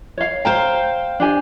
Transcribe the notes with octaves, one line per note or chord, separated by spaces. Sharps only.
C#5 F5
C5 F5 G5 A#5
D4 G4 G#5